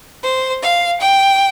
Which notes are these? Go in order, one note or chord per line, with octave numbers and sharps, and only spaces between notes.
C5
F5
G5